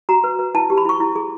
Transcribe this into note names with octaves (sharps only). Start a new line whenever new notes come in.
F#4 A#5
B4
B4
E4 A5
G4
B5
E4 C#6
E4
G#4